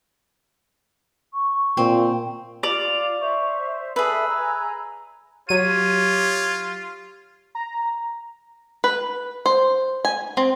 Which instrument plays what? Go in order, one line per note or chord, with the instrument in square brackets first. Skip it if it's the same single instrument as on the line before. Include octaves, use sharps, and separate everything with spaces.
[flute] C#6
[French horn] A#2 [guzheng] C4
[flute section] F4 [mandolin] D5 [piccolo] F7
[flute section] C5 E5 [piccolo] C#6
[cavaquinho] G#4 B4 [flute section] A4 E5 [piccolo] E6
[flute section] G#5 A#5
[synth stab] F#3 D#7 [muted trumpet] F4 [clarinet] G4 [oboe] C#5
[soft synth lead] A#5
[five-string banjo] B4
C5
G#5
C4